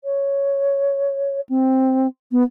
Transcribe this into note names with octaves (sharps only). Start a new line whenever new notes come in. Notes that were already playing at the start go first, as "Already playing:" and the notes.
C#5
C4
B3